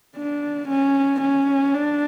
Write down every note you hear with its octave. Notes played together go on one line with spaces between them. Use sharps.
D4
C#4
C#4
D4